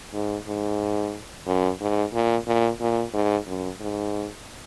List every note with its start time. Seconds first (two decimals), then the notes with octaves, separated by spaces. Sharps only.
0.14 G#2
0.47 G#2
1.47 F#2
1.81 G#2
2.13 A#2
2.47 A#2
2.80 A#2
3.14 G#2
3.47 F#2
3.80 G#2